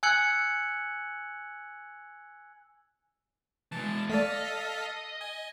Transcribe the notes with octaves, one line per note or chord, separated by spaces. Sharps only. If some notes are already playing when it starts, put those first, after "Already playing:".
G#5 E6 F#6 G#6 C#7 F#7
E3 G#3 A5
A3 A4 D5 D#5 F5 B6
G#5